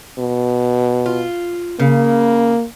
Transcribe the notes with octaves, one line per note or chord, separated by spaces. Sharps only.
B2
F4
C#3 A#3